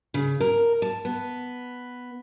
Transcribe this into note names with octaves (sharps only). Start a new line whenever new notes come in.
C#3
A#4
A5
B3